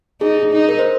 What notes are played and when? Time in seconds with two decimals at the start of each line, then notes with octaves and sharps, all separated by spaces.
0.21 D#4 G#4
0.52 D#4
0.69 A#4
0.79 C5